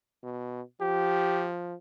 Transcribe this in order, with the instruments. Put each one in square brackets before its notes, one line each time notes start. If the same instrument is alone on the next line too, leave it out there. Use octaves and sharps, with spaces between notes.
[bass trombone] B2
[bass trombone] F3 [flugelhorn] G4